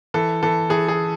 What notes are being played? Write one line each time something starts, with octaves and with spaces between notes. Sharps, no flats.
E3 A4
E3 A4
E3 G#4
G#4